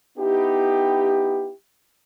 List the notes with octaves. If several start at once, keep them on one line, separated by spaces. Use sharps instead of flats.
B3 D#4 E4 G4